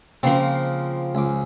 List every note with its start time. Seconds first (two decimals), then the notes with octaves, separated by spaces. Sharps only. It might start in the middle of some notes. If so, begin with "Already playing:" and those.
0.23 C#3 F3 A#3 C4
1.15 C#2 D6